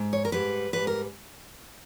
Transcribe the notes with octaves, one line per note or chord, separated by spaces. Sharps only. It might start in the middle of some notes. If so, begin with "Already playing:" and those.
Already playing: G#2
C#5
A#4
G#2 G3 B4
G#2 G3 B4
A#4